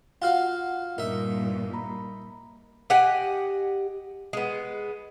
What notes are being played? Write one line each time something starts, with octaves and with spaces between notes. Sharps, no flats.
F4 F#4 F5 F#5 F6
G2 A#2 D#4 A#4 E5
A#3 A#5 B5
G4 D#5 F#5 G#5
G#3 B3